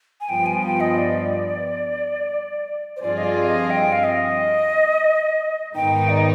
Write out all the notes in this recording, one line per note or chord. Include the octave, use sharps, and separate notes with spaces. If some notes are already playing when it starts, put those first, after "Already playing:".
G#5
G2 F3 B3 G5
G#5
G5
D#5
D5
C5
G2 F3 C4 F4 G#4 D5
D#5
D5
D#5
G5
F5
D#5
G#2 D#3 B3 D#4 G5
D5
D#5